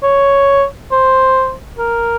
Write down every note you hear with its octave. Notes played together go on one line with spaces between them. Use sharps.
C#5
C5
A#4